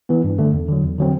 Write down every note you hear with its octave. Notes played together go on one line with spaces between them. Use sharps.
E3 B3
G2
D3 A3
E2
D3 F#3
E2
D3 F#3 C4